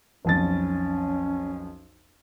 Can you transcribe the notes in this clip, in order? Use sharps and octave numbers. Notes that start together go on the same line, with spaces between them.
B1 F2 C#4 A6